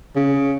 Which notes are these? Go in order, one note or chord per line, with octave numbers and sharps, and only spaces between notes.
C#3